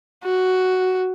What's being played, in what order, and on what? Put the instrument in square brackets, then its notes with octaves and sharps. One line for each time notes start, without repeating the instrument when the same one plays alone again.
[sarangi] F#4